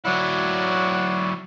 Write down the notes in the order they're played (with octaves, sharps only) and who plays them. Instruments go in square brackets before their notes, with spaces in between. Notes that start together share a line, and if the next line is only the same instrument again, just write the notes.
[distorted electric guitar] F#3 E4 [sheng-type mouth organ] C#5 D5 [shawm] F#5